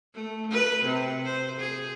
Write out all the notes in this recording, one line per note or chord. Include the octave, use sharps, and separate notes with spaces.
A3
B4
C3
C5
G#4